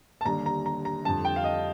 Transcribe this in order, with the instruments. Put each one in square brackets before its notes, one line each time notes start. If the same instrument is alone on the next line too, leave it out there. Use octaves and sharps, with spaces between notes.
[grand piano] A5
D#2 D3 G3 A#5
A#5
A#5
A#5
F2 D3 G3 A5
G5
F5
D#5